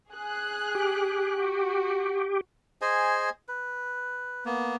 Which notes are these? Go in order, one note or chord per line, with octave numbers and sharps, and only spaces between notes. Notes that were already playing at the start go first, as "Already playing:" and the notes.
G#4 F#6
G4
F#4
G#4 C5 D#5 G#5
B4
A#3 B3